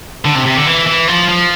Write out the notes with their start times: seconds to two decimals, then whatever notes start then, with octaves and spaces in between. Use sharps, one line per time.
0.25 D3
0.35 C3
0.46 C3
0.57 D3
0.67 E3
0.87 E3
1.08 F3
1.29 F3